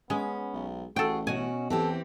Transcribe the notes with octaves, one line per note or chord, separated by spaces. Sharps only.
G#3 B3 C#4
B1
A1 F#4 G#4 A4 G5
B2 C#4 F#4 G#5
E2 E3 C4 G4 A4